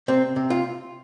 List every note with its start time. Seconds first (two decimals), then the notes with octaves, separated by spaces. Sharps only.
0.08 C3 C4
0.36 C3
0.50 F4